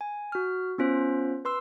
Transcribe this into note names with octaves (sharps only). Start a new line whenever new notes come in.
G#5
F#4 F6
B3 C#4 F4 C5
B4 C6 E6